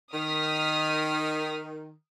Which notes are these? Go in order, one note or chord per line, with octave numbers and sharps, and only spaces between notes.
D#3 D#6 F6 B6